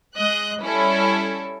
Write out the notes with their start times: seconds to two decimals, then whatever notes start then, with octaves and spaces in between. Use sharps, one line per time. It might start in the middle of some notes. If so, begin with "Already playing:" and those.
0.16 G#3 D#5 F#6
0.60 G3 C#4 E4 A4